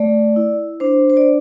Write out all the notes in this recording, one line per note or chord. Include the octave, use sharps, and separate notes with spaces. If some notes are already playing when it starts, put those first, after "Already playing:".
Already playing: A3 D5
E4
D4 C5
C5
D5